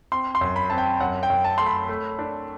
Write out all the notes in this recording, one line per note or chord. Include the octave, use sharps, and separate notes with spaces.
C4 C6
C6
F#2
B5
C4 A5
G5
F#2 F#5
G5
F#2
A5
A3 C6
B5
A3
D4